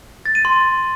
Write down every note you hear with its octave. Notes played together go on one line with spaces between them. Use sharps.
A6
D#7
C6